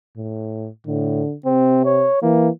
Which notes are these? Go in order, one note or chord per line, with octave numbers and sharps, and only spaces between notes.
A2
A2 D3
C3 C4
C#5
E3 A#3